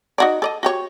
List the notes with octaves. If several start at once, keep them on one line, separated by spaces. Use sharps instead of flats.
D#4 F#4 D5
A4 D5 D#5
F#4 G4 C#5